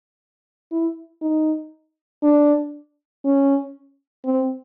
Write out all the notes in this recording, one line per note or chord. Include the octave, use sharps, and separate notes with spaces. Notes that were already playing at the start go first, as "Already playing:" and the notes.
E4
D#4
D4
C#4
C4